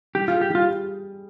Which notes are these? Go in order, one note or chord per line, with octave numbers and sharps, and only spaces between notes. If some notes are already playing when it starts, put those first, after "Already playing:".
G3 G4
F4
G#4
G4
G3 F4